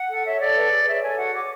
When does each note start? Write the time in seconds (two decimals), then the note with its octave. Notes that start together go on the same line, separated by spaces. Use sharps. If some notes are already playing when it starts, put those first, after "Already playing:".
Already playing: F#5
0.09 A4
0.24 C#5 E5
0.39 A4 D5
0.55 B4
0.71 G#4
0.86 C#5 E5
1.02 A4 G#5
1.17 F#4 F#5
1.33 C#5 D6